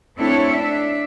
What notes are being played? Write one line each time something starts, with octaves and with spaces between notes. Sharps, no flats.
A3 C4 D4 E4 A4 C#5
D4 E5